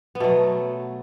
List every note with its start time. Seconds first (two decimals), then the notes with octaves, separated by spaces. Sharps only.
0.15 B3
0.20 B2 F#3 A3